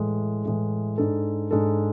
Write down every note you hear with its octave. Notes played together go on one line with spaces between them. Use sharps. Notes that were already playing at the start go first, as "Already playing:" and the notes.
Already playing: A2 E3 G#3
A2 E3 G#3
G#2 G#3 D4 A4
G#2 G#3 D4 A4